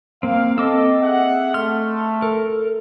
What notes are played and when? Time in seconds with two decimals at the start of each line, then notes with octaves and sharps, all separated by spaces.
0.23 A#3 C4 F5
0.58 C4 A4 D#5 D6 E6
1.01 G#4 E5 F#5
1.54 A3 C6 F6
2.22 A4 A#4